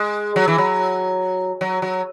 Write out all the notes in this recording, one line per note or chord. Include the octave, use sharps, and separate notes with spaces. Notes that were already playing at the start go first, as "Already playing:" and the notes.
Already playing: G#3
F#3
E3
F#3
F#3
F#3